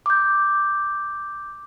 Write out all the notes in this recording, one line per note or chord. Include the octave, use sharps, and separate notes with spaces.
D6 G6